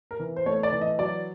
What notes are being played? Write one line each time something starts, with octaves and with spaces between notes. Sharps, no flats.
A#4
E3
C5
A3 C#5
D5
E3
D#5
F#3 D5